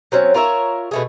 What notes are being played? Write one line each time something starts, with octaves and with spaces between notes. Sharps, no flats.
F#3 C4 C#4
F4 A#4 C#5 E5
B2 A3 G#4